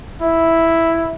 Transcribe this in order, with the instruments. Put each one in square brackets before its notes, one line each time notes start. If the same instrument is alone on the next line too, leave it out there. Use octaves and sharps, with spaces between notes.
[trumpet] E4